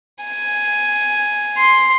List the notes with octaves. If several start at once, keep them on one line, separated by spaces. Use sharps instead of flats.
G#5
C6